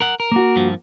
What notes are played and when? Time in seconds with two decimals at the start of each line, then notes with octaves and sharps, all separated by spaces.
0.01 A#4 F#5
0.20 A#4
0.32 A#3 F#4
0.56 G2 F3